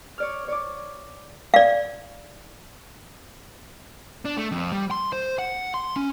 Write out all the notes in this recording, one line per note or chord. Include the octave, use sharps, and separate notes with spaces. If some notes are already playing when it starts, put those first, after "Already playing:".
C#5 D5 F6
C#5 D5 D6
D5 F5
D4
A3
F2
G3
C6
C5
F#5
C6
C#4